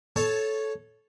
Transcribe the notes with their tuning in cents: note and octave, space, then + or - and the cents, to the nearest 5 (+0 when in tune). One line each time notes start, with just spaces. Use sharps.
A4 -15 C#5 +0 A5 +0